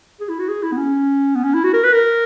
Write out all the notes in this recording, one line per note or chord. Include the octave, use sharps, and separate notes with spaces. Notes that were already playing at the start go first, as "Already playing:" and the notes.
G#4
E4
F#4
G#4
E4
B3
C#4
B3
C#4
E4
F#4
A#4
B4
A#4